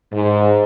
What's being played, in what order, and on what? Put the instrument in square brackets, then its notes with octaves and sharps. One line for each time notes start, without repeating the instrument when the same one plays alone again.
[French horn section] G#2